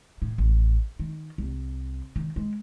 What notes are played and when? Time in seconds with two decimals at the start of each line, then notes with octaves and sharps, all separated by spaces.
0.22 A2
0.38 A1
1.00 D#3
1.38 C2
2.16 D#3
2.36 G#3